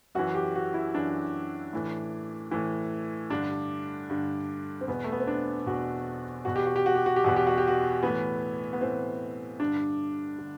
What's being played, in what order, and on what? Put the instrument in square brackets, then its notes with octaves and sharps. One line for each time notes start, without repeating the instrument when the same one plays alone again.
[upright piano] F#2 E3 F#4
G4
F#4
E4
F#2 E3 D4
A2 E3
A2 E3
G2 D3 D4
G2 D3
C4
E2 B2 B3
A3
B3
C4
D4
E2 B2 F#4
E2 B2 F#4
G4
F#4
G4
F#4
G4
F#4
G4
E2 B2 F#4
G4
F#4
G4
F#4
A2 E3 B3
B3
A2 E3 C4
G2 D3 D4
D3